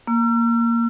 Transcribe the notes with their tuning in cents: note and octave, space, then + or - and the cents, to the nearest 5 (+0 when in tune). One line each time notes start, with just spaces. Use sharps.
A#3 +0 E6 +45